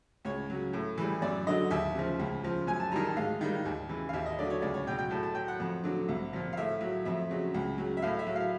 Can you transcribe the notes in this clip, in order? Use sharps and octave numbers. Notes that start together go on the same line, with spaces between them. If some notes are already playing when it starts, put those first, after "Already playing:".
C#2 C#5
C#3 F#3
A2
E3 G3
F#2 D5
D3 F#3 D#5
D#2 E5
C#3 F3
C#2
C#3 F3
F#2 G#5
A5
D#3 G3 A#5
A5
G#2 F5
D#3 G3
D#2
C#3 E3
F5
D#2 E5
D#5
D3 F#3 D5
C#5
C#2 D5
C#5
B2 F#3 G5
G5
A2 A5
A5
F#3 G5
F#5
F2
D3 F#3
C2
A#2 F3
F5
A2 E5
F#3
F2 E5
C#3 F#3
C#2
C#3 F#3
E5
A2 F5
E5
F#3
F5